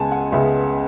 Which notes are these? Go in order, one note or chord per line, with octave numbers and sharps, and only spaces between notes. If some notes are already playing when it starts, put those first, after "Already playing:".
Already playing: C#2 C#3 G#3 B3 G#5 A5
F#5
C#2 C#3 G#3 B3 E5